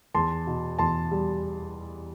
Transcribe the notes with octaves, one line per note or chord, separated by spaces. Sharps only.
E2 A5 C6
B2
E2 A5 C6
G3